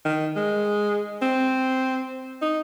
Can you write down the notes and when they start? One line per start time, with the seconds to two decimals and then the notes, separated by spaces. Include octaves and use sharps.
0.05 D#3
0.36 G#3
1.22 C4
2.42 D#4